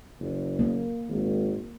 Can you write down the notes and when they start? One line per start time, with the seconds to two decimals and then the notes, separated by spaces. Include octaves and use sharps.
0.20 F#1
0.59 A#3
1.08 G#1